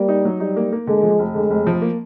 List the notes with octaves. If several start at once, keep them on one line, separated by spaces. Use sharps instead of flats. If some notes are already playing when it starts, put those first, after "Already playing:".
Already playing: G3 A#3
D#4
F#3
G3 D#4
A#3
A#3
D3 G#3
F3
F1
D3 G#3
F1
F3
A#3